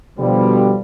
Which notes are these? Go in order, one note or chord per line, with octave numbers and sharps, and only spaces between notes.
B2 D3 F3 G3